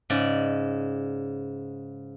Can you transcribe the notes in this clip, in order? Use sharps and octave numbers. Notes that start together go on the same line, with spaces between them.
G#2 C#3 D5